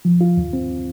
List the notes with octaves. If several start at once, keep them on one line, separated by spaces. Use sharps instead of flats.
F3
F4
D#2
C4